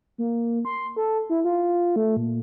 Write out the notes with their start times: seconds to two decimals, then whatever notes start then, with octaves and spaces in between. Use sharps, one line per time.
0.18 A#3
0.65 C6
0.96 A4
1.30 E4
1.44 F4
1.96 A3
2.17 A#2